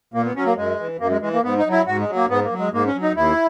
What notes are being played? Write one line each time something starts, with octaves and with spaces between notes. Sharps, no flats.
A#2 A#3
B3
F#3 C#4
A#3
F#2 G#3
E3
F#2 A#3
G#3
E3 G#3
A#3
G#2 B3
D#4
F#3
E4
G#2 F#4
G#3
F#3
A#3
G#2 B3
A#3
F#3
G#3
G#2 A#3
C#4
F#3
D#4
D#2 E4